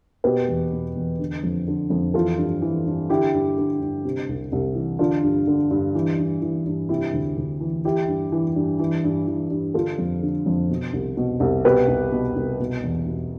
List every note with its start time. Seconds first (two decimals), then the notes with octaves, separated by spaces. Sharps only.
0.24 B2 G4 B4
0.48 E2
0.73 B2
0.96 E2
1.19 D3
1.43 F2
1.67 D3
1.90 F2
2.14 E3 F4 A4
2.38 G2
2.62 E3
2.86 G2
3.09 D3 E4 G4
3.34 G2
3.58 D3
3.81 G2
4.05 C3
4.29 C2
4.52 C2
4.75 E3
4.99 D3 D4 F4
5.23 G2
5.47 D3
5.71 G2
5.95 E3
6.18 G2
6.42 E3
6.66 G2
6.89 C3 E4 G4
7.13 D2
7.37 D2
7.61 E3
7.84 E3 E4 G4
8.08 G2
8.32 E3
8.56 G2
8.79 E3
9.04 G2
9.27 E3
9.51 G2
9.74 D3 F4 A4
9.98 F2
10.22 D3
10.46 F2
10.69 B2
10.93 C2
11.17 B2
11.40 C2
11.64 B2 G4 B4
11.88 C2
12.12 B2
12.36 C2
12.60 B2
12.83 E2
13.06 B2